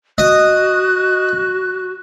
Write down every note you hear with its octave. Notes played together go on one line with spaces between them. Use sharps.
F#4 D#5 F#6